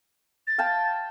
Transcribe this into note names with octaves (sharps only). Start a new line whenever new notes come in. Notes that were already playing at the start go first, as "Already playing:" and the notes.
A6
F5 G5 A5